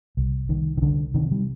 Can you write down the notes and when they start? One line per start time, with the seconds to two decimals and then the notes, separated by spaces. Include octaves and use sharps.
0.17 C2
0.49 C2 D#3
0.77 D#3
0.82 C2 D3
1.14 C3 D#3
1.31 G3